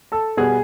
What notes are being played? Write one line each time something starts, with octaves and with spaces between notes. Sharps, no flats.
A4 A5
B2 G3 B3 G#4 G#5